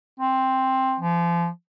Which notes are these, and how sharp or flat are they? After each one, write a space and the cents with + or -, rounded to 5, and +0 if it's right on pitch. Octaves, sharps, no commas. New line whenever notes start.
C4 +5
F3 -35